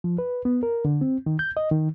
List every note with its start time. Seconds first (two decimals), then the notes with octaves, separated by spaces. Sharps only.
0.04 F3
0.18 B4
0.45 B3
0.63 A#4
0.85 D3
1.01 C4
1.26 D#3
1.39 G6
1.57 D#5
1.71 D#3